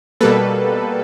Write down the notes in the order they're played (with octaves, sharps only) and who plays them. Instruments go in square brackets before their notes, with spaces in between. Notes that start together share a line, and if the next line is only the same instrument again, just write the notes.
[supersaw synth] B2 G3 A#3 A4 B4